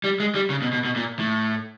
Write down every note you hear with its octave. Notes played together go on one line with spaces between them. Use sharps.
G3
G#3
G3
C#3
B2
B2
B2
A#2
A2